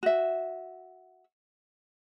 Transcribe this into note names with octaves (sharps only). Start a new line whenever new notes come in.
F#4 E5